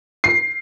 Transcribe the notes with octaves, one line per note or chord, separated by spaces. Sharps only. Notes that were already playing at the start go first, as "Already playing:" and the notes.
C7